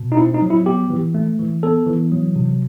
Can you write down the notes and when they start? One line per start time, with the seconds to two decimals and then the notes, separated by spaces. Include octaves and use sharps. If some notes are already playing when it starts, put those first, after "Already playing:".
Already playing: B2
0.12 D#4
0.17 C4 E4
0.34 D#4
0.42 F#3
0.50 E4
0.65 B3 G4
0.90 E3
1.14 A3
1.39 E3
1.63 B3 A4
1.87 E3
2.12 F#3
2.36 C3